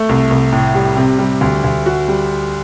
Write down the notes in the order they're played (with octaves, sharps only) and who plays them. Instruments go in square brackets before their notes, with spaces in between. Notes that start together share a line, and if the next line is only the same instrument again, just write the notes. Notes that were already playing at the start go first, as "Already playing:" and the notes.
Already playing: [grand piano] A3
C2
C2
A2
G3
C3
G3
D2
D2
F#4
G3